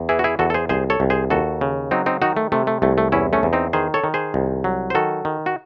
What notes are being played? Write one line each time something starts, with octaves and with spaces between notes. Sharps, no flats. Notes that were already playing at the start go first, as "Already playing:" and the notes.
Already playing: E2
E3 E4 G#4
F#4
E4 G#4
E2 F#4 A4
A4
G#4 C5
C2 G#4 C5
A4 C#5
C2
G#4 C5
D#2 F#4 A4
C#3
F#3 C4 D#4
C4 D#4
D#3 D#4 F#4
A3
C3 A3
A3
C2 A3
A3
E2 C#4 E4
A3 C#4
E2
C4 D#4
D#3 G#4 C5
A4 C#5
D#3
G#4 C5
C2
F#3
C5
D#3 F#4 A4
D#3
F#4